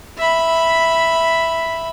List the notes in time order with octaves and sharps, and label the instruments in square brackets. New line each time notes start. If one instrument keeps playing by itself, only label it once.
[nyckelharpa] E5 B5